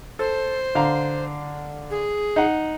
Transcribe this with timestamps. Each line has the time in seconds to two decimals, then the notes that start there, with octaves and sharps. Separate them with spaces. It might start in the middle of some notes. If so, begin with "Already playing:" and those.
0.19 A4 C5
0.75 D3 F5 A#5
1.90 G#4
2.36 D#4 F#5